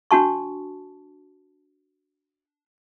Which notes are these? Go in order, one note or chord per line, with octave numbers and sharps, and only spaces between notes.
D4 F#4 A5 C#6